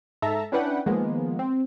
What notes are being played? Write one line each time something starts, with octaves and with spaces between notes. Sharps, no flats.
G#2 A4 E5 A5 A#5
C#4 D4 E4 B4 F#5 G5
D#3 F3 G#3 A#3 B3
C4